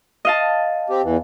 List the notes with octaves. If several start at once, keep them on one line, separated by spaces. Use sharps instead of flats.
D#5 F5 A5
C4 G4
E2 E3